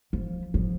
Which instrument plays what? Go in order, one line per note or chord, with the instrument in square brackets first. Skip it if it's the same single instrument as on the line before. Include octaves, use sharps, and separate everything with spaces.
[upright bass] F3
F3